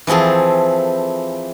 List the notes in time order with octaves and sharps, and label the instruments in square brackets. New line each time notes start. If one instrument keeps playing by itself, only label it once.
[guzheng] E3 F3 C4 G#4 A4